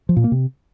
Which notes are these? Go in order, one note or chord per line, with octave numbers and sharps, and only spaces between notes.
F3
A#2
A#3
C3